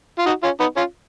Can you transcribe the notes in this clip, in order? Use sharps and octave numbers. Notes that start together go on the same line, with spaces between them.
F4
D#4 F#4
C#4 F4
B3 D#4
C#4 F4